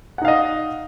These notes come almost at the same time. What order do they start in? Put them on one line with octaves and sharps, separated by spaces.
F#5 D#4 F5 D#5